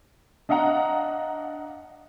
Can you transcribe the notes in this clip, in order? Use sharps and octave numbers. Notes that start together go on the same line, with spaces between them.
D4 D#5 F5 F#5 A#5